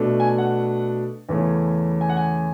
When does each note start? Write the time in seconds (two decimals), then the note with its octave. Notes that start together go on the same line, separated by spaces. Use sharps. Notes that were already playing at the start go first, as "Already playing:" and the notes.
Already playing: B2 A3 D4
0.20 G#5
0.38 F#5
1.29 E2 C#3 E3 A3 C#4
2.01 G#5
2.09 F#5
2.17 G#5